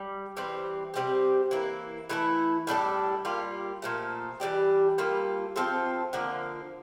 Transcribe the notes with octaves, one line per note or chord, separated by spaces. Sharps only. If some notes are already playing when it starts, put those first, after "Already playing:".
Already playing: G3
E3 G3 C4
C3 G3 C4 G4
E3 A#3 E4
E3 A3 E4 A4
A2 G3 D4 A4
G3 A#3 F4
A#2 F3 A3
E3 G3 D4 G4
G3 A#3 F4 A4
F3 C4 F4 A4
D3 F3 A#3